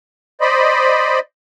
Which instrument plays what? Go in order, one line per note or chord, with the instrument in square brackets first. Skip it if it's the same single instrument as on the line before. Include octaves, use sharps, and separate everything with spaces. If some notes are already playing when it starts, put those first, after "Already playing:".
[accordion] C5 D5 D#5 B5